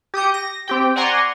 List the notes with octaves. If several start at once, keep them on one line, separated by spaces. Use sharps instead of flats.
G4 D#6 G6 C#7
A#6
C4 G4 G5
D5 F#5 G#5 A#5 C6 C#6